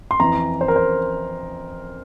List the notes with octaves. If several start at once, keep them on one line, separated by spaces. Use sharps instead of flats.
C6
F2 E3 A#5
C5
A#4
C5